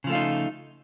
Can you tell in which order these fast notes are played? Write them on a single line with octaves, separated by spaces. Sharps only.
C#3 F3 A3 F4 D#4